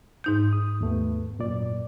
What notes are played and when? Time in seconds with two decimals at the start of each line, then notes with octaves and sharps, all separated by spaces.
0.24 G#2 D#4 G6
0.53 D#6
0.81 D#2 A3 B3
1.39 F#2 A#2 D5